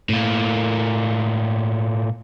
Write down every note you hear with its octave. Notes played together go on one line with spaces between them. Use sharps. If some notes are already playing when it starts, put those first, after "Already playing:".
A2 A#3